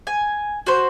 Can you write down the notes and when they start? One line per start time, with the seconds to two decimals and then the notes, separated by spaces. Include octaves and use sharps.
0.07 G#5
0.66 F#4 C5